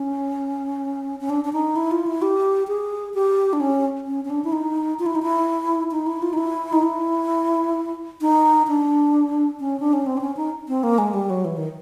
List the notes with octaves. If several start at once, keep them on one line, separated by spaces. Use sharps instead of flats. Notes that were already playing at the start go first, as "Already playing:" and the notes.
Already playing: C#4
C#4
D4
D4
D#4
E4
F4
E4
G4
G#4
G4
D4
C#4
C#4
C#4
D4
E4
D#4
F4
E4
D#4
E4
D#4
E4
F4
D#4
E4
D#4
E4
D#4
D4
C#4
D4
C#4
C4
D4
C#4
D#4
C4
A#3
G#3
G3
F#3
E3
D#3